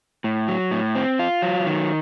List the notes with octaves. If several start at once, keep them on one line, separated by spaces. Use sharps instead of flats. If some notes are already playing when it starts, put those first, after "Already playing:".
A2
F#3
A2
C4
F4
F#3
D#3